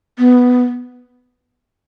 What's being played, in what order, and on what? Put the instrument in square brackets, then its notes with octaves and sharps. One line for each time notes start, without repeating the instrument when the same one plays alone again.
[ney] B3